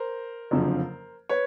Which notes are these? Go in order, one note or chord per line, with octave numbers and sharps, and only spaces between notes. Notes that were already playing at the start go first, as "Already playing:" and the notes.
Already playing: A#4 C5
F#1 F2 D3 F3
B4 C#5